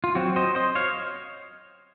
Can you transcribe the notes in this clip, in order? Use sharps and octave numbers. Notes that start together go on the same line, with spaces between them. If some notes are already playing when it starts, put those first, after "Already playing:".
F4
F#3 C4 F#4
C5 D#5
C5 D#5
C#5 F5